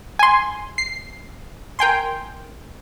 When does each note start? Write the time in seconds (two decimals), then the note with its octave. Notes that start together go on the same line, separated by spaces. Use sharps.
0.19 G#5 C6
0.78 C7
1.79 A#4 G5 G#5 C6